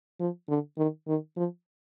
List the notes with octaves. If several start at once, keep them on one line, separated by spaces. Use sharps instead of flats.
F3
D3
D#3
D#3
F3